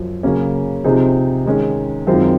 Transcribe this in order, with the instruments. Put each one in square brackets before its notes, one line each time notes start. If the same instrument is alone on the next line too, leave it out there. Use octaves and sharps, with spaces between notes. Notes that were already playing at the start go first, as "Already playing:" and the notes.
Already playing: [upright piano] F#2 F3
C#3 F#3 A#3 C#4
C3 F3 C4 D#4 G#4
D#3 G#3 C#4
F#2 D#3 G#3 C4 F4